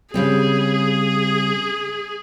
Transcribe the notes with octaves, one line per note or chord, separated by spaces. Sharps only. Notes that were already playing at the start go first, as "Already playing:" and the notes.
C#3 G3 C4 G#4